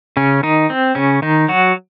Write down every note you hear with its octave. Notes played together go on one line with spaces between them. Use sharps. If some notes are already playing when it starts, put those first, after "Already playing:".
C#3 C#4
D#3 D#4
C4
C#3 C#4
D#3 D#4
F#3 F#4